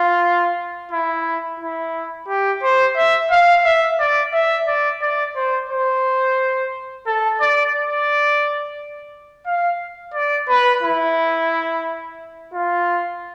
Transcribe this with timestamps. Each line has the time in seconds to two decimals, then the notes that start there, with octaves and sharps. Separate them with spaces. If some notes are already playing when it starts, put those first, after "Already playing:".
Already playing: F4
0.92 E4
1.60 E4
2.28 G4
2.63 C5
2.96 E5
3.31 F5
3.65 E5
3.99 D5
4.33 E5
4.67 D5
5.02 D5
5.36 C5
5.70 C5
7.07 A4
7.40 D5
7.75 D5
9.46 F5
10.14 D5
10.49 B4
10.83 E4
12.54 F4